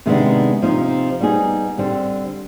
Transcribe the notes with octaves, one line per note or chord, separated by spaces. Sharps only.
C3 D#3 G#3 B3 D4
C3 F3 C4 D#4
G3 B3 D#4 G#4
D3 G3 C4